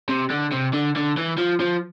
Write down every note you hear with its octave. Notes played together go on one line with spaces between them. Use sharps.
C3
D3
C3
D3
D3
E3
F3
F3